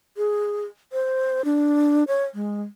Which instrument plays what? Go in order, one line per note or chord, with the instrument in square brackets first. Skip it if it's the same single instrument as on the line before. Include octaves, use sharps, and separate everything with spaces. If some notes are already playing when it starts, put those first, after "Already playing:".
[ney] G#4
C5
D4
C#5
G#3